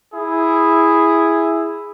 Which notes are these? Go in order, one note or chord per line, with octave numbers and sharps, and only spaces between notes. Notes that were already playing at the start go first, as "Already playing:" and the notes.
E4 G#4